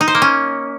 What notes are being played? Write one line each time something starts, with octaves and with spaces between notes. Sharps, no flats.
D#4
C5
A#3
C#4